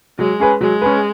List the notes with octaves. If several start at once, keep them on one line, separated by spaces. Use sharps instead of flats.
F#3 G#3
C#4 G#4 B4
F#3 G#3
C#4 G#4 B4